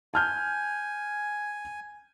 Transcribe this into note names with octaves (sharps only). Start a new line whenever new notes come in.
G#5 A5 F6 G6